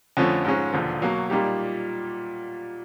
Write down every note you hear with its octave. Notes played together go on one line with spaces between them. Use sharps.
F2 D3 F3 A3 C#4
G#2 F3 G#3 C#4
E1 D#2 D3 F3
B2 F#3 A#3
A#2 G3 A#3 D#4 G4